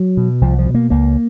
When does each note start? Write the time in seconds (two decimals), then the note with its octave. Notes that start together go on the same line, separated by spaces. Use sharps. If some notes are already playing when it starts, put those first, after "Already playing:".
Already playing: F#3
0.17 B2
0.41 C2 F3
0.59 F3
0.66 B2
0.75 A#3
0.90 C#2 A#3